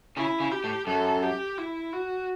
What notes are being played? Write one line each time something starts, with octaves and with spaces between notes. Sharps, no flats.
C#3 E4
C#3
G4
A2
F#2 A4
G4
E4
F#4